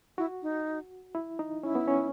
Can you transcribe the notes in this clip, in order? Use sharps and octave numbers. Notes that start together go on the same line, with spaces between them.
E4 F#4
D#4
E4
D#4
C#4 E4
B3
C#4